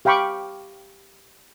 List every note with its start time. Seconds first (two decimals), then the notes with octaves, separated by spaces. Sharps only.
0.05 G4 F5 G5 B5 C#6 D6